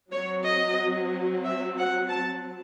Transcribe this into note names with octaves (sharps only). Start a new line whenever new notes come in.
F#3 C4 C#5
D#5
E5
F#5
A5